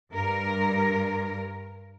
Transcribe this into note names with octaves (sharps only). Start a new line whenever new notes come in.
G2 A#4